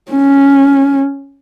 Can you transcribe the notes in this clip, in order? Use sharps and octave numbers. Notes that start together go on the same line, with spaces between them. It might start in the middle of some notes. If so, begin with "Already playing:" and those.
C#4